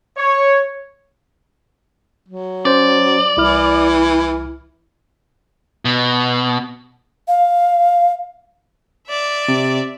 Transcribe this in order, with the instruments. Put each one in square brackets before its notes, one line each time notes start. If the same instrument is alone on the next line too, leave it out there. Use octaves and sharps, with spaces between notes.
[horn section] C#5
[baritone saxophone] F#3
[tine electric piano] C#4 C5 [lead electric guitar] D5
[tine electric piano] C2 E4 F6 [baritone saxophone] E3
[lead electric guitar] B2
[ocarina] F5
[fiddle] D5 E5
[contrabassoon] C3